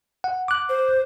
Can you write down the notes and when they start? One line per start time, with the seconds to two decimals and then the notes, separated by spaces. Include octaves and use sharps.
0.24 F#5
0.48 D6 F#6
0.69 C5